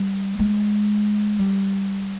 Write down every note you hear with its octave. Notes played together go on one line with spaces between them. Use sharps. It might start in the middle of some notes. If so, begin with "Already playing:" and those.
Already playing: G3
G#3
G3